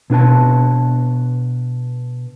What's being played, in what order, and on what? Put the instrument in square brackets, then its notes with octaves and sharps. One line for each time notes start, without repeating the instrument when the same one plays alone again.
[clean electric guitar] B2 D4 B4 A5